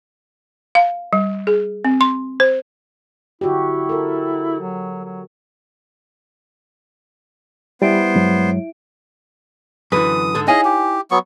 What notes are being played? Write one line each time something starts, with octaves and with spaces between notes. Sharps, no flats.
F5
G3
G#4
C4
C6
C5
D3 E4 F#4 G4
A4 A#4
F#3
F#3
G3 B3 E4 C5 E5 D7
G2 F#3 G#3
F#2 D3 E3 B4 D#6
G#2 D3 A4
D#4 E4 G#4 C#5 D#5 F5 G#5
G4
F#3 B3 C#6